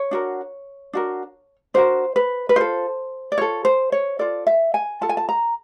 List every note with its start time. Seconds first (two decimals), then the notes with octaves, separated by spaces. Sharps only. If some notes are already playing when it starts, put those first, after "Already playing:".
Already playing: C#5
0.11 D4 F#4 A#4
0.93 D4 F#4 A#4
1.74 D4 F#4 A#4 C5
2.16 B4
2.49 B4
2.56 F4 A4 C5
3.32 D5
3.38 F4 A4 C#5
3.65 C5
3.92 C#5
4.19 F4 A4 D5
4.47 E5
4.74 G#5
5.01 F4 A4 A5
5.09 G#5
5.17 A5
5.29 A#5